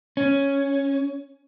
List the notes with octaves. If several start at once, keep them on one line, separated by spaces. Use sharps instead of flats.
C#4